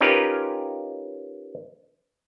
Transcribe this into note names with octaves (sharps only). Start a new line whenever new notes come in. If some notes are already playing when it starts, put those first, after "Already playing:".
C#4 D#4 F4 G4 A#4 B4